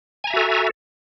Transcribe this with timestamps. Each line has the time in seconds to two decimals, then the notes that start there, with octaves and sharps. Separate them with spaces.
0.24 G#5
0.27 A#5
0.30 E5
0.33 F#4
0.37 A4